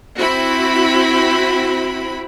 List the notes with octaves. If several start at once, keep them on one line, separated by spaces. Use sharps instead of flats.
C4 E4 F#4 B5